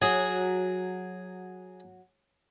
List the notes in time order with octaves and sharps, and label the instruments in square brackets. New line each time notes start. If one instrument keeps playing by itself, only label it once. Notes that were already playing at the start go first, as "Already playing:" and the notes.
[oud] F#3 [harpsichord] G#4